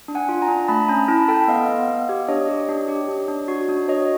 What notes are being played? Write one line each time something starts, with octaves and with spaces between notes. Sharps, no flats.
D4
F#5 G#5
F4
G#5 A#5
D4
A3 A5 B5
C#4 G#5 A#5
E4 A5 B5
A4 G5 A5
B3 D#5 F5
B3
B3
G4
D4 C#5 D#5
G4
D4
G4
D4
D4
F#4
D4
F#4 C#5 D#5